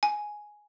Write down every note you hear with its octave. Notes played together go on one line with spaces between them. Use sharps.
G#5